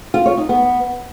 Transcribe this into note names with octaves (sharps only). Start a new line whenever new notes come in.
F4
C#5
D#4
B3